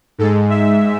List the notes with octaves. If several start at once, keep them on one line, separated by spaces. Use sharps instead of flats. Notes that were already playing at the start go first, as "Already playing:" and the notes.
G#2 G#3 A4
E5